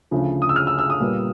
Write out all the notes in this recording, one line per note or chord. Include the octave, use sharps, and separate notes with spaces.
D2 C#3 F3
D#6
E6
F6
E6
E6
D#6
A#2 G3 B3